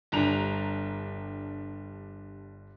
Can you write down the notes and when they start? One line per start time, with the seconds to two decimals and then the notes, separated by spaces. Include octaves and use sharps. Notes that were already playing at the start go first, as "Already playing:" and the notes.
0.12 G1 G3 D4 A#5 F7